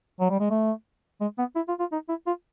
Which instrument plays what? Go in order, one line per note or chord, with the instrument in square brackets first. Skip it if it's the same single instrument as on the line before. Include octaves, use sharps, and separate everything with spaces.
[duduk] F#3
G3
G#3
A3
G#3
B3
E4
F4
F4
D#4
E4
F4